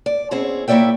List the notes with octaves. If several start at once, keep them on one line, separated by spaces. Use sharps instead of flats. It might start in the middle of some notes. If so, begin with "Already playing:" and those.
D5
B2 C4 C#4 E4 G#4
A#3 E4 C#5 D5 E5 G5